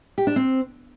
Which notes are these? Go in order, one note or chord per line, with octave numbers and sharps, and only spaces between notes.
G4
D4
C4